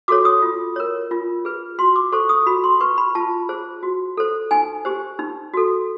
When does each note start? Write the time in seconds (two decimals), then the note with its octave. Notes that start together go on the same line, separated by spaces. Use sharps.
0.08 F#4 A4 C#5 D6
0.25 D#6
0.42 F4
0.76 A#4 C#5
1.11 F4
1.45 G#4 B4
1.78 F#4 C6
1.96 D6
2.12 A4 C5 C#6
2.29 D#6
2.47 F#4 B5
2.64 C6
2.81 B4 C#6
2.98 B5
3.15 F4 A5
3.49 G#4 C5
3.83 F#4
4.17 A4 C5
4.51 D#4 G#5
4.85 G4 C5
5.19 D#4
5.54 F#4 A4